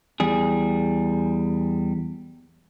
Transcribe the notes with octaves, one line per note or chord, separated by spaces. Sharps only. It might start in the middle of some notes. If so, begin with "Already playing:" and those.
E2 G3 G#4